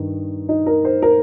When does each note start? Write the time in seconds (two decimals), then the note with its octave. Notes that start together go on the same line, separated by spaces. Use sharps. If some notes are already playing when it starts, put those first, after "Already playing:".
Already playing: G2 D#3 D#4
0.49 D#4
0.66 A#4
0.85 C5
1.02 A#4